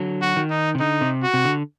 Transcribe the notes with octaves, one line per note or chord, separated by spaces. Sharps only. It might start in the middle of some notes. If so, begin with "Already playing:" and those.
Already playing: D3 F#3
F#4
D#3
D#4
C3
D3 D#4
C3
F#4
C3
D3